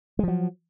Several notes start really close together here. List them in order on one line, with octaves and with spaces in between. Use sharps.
G#3 F3 F#3